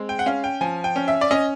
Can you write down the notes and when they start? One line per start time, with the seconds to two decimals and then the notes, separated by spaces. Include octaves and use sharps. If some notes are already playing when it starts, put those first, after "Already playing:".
Already playing: G#3 C4
0.09 G5
0.19 F#5
0.26 C#4 F5
0.44 G5
0.61 F3 G#5
0.84 G5
0.96 C#4
1.08 E5
1.21 D5
1.31 C#4 D#5